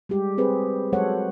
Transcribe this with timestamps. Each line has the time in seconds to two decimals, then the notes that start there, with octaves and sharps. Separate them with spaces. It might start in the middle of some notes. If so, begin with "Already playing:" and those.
0.09 G3 G#3 G4
0.38 C4 G#4 B4 C5
0.93 F#3 G#3 A4 C5 C#5 F#5